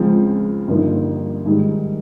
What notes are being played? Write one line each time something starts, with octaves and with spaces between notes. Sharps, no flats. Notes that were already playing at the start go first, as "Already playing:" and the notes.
Already playing: C#2 C#3 F3 G#3 C4
G1 G2 F3 A#3 D#4
G#2 D#3 G3